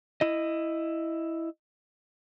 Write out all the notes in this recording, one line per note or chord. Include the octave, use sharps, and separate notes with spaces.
E4 D#5